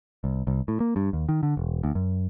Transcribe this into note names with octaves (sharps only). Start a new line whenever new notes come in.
C2
C2
A2
A#3
G2
D#2
D#3
D3
E1
D2
F#2